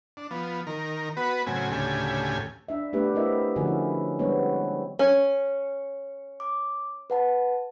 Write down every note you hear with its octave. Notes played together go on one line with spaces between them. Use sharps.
D4
F3 B3
D#3 A#4
B3 F#4 B4
A2 C#3 F#3 C4 G#5
D2 A2 C#3 G4 G#5
D4 E5
A3 B3 D4 G4 B4
C4 E4 A#4 D#5 E5
D3 F3 C#4 F#4 A#4
E4
G3 G#3 B3 C4 D4 C#5
C#4
D6
B4 F#5 A5